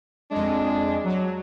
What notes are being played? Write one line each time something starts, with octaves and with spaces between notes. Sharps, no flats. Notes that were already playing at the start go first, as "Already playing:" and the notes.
F2 G#3 D4
F#3